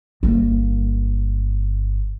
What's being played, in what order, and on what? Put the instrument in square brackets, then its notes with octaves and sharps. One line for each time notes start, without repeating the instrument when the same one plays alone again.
[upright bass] G1 A#3